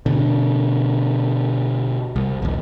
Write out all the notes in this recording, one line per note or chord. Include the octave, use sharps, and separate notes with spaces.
B2 D3
C2
A#1 D#2